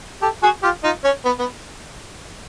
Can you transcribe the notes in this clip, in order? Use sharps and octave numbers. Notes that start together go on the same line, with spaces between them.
G4 A4
F#4 G#4
F4 G4
D#4 F4
C#4
B3
B3